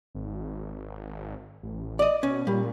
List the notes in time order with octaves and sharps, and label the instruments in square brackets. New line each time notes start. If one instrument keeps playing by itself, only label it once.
[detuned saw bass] G#1
A1
[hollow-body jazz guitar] D5 D#5
[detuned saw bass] B2 [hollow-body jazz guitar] C#4
[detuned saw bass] A#2 [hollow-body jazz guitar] G3